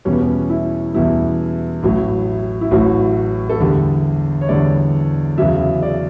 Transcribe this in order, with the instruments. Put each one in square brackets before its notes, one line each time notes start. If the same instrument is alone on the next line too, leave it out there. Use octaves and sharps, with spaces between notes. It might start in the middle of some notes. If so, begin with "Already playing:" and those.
[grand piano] E2 B2 G3 C#4
B3
C#4
E4
E2 B2 G3 E4
A1 A2 F#3
E4
A1 A2 F#3 F#4
A4
E2 D3 G3 G4
C#5
E2 D3 G3 D5
E2 C#3 F#3 E5
D5